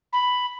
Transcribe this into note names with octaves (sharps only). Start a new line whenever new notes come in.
B5